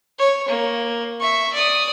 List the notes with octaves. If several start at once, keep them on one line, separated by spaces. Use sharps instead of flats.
C#5
A#3
E5 C#6
D5 D#6